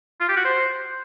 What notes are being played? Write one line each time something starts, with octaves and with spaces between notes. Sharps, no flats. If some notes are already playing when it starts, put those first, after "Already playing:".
F4
G4
F#4
C5